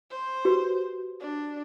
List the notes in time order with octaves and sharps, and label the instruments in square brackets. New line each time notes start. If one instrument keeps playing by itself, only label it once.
[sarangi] C5
[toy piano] F#4 G4 B4
[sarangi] D4